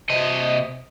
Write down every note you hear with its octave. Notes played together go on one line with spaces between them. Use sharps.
C3 D#5